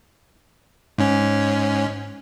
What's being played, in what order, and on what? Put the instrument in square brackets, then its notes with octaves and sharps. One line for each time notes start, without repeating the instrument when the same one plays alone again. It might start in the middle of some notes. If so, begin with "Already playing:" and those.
[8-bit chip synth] G#2 C#4